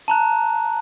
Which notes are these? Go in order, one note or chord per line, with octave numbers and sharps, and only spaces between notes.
A5 A#5 F#6